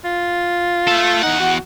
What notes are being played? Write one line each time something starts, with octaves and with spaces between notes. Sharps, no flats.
F4
A3 A4
E2 D#4 F#5
F#4